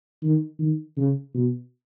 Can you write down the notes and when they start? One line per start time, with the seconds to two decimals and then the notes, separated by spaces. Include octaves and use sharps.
0.22 D#3
0.59 D#3
0.97 C#3
1.34 B2